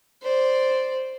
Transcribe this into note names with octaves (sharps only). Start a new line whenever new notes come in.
C5 D5